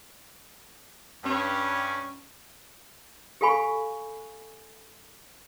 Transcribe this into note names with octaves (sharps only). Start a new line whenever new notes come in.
G2 C#4
G4 A4 F5 G#5 B5 C#6